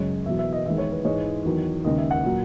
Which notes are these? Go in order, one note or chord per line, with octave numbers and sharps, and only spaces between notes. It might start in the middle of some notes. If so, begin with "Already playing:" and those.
Already playing: F#2 C#3 G#3 C#5
E2 B2 F#3 E5
E5
D#5
E2 D#3 G#3 E5
C#5
B4
G#2 E3 G#3 C#5
E2 D#3 F#3
D#2 C#3 G#3 D#5
E5
F#5
A#2 F#3